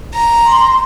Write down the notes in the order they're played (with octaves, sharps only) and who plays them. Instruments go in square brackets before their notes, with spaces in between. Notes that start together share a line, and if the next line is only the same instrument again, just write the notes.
[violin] A#5
[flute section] C6